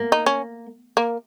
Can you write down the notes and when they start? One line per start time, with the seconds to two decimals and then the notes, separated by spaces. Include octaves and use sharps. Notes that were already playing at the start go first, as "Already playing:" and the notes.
Already playing: A#3
0.12 D#4
0.26 C#4
0.97 A#3